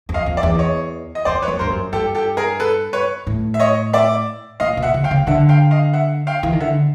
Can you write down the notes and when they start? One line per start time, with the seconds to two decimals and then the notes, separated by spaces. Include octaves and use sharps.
0.09 F2
0.14 D#5 F5
0.26 F2
0.37 D5 E5
0.43 E2
0.59 C#5 D#5
1.15 D#5
1.25 F2 C5 D5
1.42 B4 C#5
1.48 F#2
1.59 G2 A#4 C5
1.70 F#2
1.93 G2 G4 A4
2.15 G4 A4
2.37 G#4 A#4
2.60 A4 B4
2.93 B4 C#5
3.27 A2
3.54 E5
3.60 C#5 D#5
3.93 D5 E5
4.60 A#2 D#5 F5
4.77 B2
4.82 E5 F#5
4.94 C#3
5.04 F5 G5
5.11 C#3
5.27 D3 E5 F#5
5.49 F5 G5
5.71 D#5 F5
5.93 E5 F#5
6.27 F5 G5
6.43 E3
6.53 D#3
6.60 D3 E5 F#5